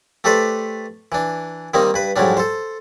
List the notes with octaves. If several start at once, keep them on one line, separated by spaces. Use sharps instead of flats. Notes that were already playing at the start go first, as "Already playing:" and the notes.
A3 G4 A4 B4 C5 D5
E3 D4
D#3 G3 A#3 C4 D#4
G2 B4
F2 G#2 F#3 G3 D4
A4 C5